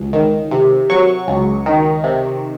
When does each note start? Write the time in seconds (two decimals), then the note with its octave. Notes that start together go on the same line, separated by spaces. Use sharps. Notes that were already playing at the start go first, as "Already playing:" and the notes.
Already playing: C#2
0.13 D#3
0.51 C3
0.90 F#3 C#6
1.28 C#2
1.66 D#3
2.04 C3